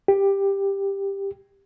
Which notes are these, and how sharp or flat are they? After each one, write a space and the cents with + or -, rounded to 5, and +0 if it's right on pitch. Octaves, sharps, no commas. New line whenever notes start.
G4 +10